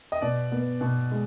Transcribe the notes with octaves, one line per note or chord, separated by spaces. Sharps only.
D#5
B2 D5
B3
B2
G#3